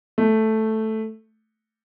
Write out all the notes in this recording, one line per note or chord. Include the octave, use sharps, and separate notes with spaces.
A3